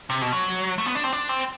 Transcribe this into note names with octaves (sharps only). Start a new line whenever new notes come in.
C3
B2
F#3
A3
B3
D4
C4
D4
C4